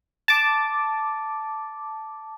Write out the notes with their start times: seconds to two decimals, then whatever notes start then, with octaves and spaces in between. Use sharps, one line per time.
0.28 A5 D6